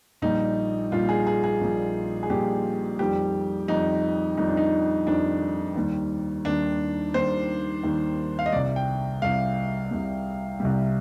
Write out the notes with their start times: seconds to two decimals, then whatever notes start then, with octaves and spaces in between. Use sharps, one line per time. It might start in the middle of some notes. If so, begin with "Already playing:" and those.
0.22 A#1 A#2 G3 D#4
0.92 A#1 A#2 G3 F4
1.09 G#4
1.27 G#4
1.44 G#4
1.61 A#1 A#2 G3
2.23 G#4
2.30 A#1 A#2 G3 G4
2.99 F2 D#3 G3 G4
3.68 F2 D#3 G3 D#4
4.37 F2 D#3 G3 D#4
4.48 D4
4.57 D#4
5.07 F2 D#3 G3 D4
5.76 D#2 D#3 G3
6.45 D#2 D#3 G3 D4
7.14 D#2 D#3 G3 C5
7.83 D#2 D#3 G3
8.39 F5
8.46 D#5
8.52 C2 C3 G3 D5
8.76 G5
9.22 C2 C3 G3 F5
9.91 C2 C3 G3
10.60 C2 C3 G3